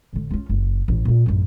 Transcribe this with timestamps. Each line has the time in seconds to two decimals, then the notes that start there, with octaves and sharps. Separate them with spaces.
0.13 A1 D3
0.31 C#4 F4
0.49 F#1
0.88 A1 D3
1.05 A#2 C#3
1.26 A1 F#2